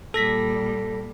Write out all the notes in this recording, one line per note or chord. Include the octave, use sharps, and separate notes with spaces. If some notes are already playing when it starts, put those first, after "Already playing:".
A#2 G3 A4 A#6 B6